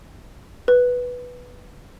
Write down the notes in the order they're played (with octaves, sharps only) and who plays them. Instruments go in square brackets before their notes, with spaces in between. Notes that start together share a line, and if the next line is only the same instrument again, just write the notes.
[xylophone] B4